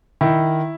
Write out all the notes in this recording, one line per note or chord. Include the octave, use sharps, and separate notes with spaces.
D#3 E4